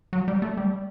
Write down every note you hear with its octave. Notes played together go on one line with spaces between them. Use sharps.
F#3
G3
A3
G3